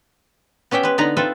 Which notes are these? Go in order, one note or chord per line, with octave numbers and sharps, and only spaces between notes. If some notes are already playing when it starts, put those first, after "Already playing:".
B3 C#4 G4 E5 G5
G#3 B4
D3 B3 D#4 B4 A#5
C4 F4 A4 B4 E5